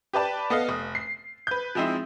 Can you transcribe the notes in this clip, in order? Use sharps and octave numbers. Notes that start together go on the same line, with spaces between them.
G4 B4 D5 A5
B3 A4 D#5 F5
F1 D#6
C7
B4 G6
F3 G#3 C4 D#4 E4